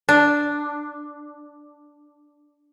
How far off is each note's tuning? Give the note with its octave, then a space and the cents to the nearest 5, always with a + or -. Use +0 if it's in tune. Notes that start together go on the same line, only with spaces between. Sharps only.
D4 +0